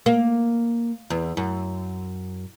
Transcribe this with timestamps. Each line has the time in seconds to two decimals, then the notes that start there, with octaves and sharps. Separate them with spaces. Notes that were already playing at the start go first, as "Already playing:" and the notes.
0.06 A#3
1.10 E2
1.37 F#2